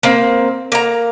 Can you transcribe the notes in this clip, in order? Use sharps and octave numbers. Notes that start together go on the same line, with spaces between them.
A#3 C4
A#3 A#5